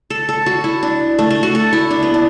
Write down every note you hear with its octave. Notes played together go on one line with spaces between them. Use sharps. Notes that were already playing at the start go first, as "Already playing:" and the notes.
A4
A4
F#4
E4
D4
A3
A3
F#4
A4
E4
D4
B3
D4